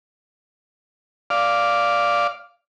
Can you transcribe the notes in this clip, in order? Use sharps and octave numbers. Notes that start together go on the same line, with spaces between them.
D5 F5